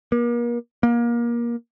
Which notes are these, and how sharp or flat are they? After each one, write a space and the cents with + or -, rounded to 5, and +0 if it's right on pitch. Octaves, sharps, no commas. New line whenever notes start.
A#3 +40
A#3 +25